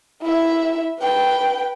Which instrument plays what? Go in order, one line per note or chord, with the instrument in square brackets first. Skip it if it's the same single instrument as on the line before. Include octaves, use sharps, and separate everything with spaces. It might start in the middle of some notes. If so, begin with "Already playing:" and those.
[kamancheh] E4 E5
B4 G5